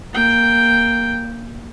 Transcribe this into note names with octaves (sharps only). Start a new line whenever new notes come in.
A#3 G5